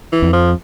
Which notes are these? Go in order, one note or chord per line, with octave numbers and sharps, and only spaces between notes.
E3
F2
F3